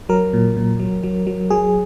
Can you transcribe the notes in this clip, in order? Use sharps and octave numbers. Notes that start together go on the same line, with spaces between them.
F#3 A#4
A#2
A#2
F#3
F#3
F#3
F#3 G#4